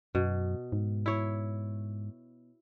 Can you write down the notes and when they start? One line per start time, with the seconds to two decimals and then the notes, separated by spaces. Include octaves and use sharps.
0.15 F#2 B2
0.72 G#2
1.06 E4 C#5